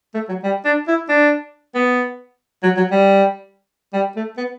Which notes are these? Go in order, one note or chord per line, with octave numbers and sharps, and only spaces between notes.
A3
F#3
G3
D4
E4
D4
B3
F#3
F#3
G3
G3
A3
B3